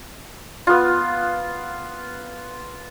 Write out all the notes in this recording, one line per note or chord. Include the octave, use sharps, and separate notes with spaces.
B3 F4